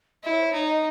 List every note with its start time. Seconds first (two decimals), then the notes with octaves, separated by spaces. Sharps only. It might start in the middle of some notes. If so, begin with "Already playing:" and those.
0.23 E4 D#5
0.30 C#5
0.40 C5
0.47 C#5
0.53 D#4
0.67 D#5